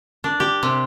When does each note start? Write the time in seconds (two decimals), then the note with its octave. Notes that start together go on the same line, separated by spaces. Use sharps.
0.24 D4
0.40 G4
0.63 C3